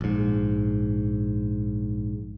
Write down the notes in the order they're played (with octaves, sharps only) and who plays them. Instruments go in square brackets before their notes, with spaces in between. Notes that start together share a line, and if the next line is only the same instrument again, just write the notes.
[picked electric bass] A#1 G#2